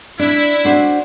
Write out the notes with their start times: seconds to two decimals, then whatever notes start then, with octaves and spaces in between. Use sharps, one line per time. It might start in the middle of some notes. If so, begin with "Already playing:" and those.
0.19 D4 E4
0.65 D4 F#4 C5